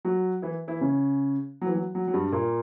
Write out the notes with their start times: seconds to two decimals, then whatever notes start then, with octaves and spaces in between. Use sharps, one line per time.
0.05 F#3 F#4
0.42 E3 E4
0.68 E3 E4
0.81 C#3 C#4
1.62 F#3
1.67 E3
1.75 F#3
1.95 F#3
2.08 F#3
2.14 G2 G3
2.32 A#2 A#3